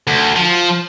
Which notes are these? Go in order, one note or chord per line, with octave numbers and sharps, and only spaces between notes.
D2
F3